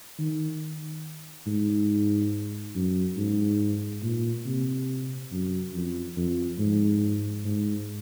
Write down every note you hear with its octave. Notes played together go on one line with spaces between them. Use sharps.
D#3
G#2
F#2
G#2
A#2
C3
F#2
F2
F2
G#2
G#2